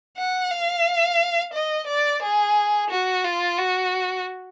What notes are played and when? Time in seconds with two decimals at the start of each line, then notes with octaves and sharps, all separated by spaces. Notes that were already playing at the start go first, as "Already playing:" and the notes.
0.18 F#5
0.51 F5
1.54 D#5
1.87 D5
2.22 G#4
2.90 F#4
3.24 F4
3.58 F#4